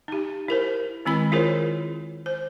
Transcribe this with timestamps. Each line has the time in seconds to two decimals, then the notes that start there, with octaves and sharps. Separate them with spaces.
0.08 D#4 G4
0.48 E4 A#4 C5
1.05 D#3 G#3 C4 E4 B5
1.32 E4 F4 G#4 A#4 C5 C#5
2.26 C5